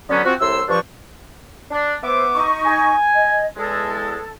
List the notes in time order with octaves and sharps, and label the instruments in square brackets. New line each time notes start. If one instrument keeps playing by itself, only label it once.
[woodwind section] D3 F#3 B3 C#4
F3 C4 F#4
C2 A2 C3 C6 E6
G2 F3 D4 C#6
D4
[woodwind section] B3 E5 D6 [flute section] C5
[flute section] D#4 C#6
[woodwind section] G#5
[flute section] D#5
[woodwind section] E2 G#3 [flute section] A4